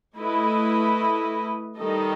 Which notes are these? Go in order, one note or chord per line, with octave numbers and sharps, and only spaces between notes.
A3 E4 B4 D#5
D#3 G3 D#4 A4 D#5